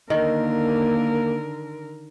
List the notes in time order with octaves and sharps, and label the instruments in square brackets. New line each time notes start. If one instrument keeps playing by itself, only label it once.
[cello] D3 A#4 [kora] D#3 [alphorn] A#3